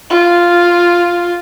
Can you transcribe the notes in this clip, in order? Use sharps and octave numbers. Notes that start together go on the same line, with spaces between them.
F4